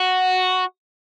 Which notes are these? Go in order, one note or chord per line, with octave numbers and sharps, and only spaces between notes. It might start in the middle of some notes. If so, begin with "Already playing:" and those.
Already playing: F#4